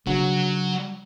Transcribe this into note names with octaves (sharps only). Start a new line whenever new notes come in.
C#3 F#3 D4 F#4